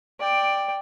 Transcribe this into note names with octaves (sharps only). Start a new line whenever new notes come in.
D5 G5